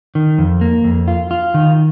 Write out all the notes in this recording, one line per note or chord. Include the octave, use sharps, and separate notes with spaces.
D#3
F2
A#3
F2
F4
F4
D#3